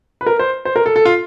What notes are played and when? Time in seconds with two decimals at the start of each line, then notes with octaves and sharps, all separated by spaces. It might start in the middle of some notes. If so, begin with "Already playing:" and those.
0.21 B4
0.26 A#4
0.39 C5
0.65 C5
0.76 A#4
0.86 A4
0.96 A4
1.05 F4